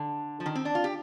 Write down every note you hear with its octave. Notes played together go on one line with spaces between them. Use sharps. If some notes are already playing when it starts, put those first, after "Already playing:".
Already playing: D3
F3
D#3
C4
D4
F4
G4